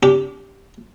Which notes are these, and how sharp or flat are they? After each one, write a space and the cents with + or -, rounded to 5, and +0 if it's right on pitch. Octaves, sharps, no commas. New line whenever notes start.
D4 -40 G4 +0